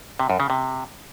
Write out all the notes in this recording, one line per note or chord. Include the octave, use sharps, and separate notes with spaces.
C3
F#2
C#3
C3